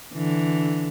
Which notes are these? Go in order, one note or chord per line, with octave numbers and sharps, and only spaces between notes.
D3 E3